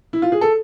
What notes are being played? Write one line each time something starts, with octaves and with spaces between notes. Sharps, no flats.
E4
F4
G#4
A4